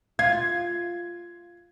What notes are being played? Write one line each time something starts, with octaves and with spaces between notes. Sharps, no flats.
F4 G#6